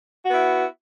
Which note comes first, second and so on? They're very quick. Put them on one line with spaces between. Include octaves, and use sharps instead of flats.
F#4 B3 E4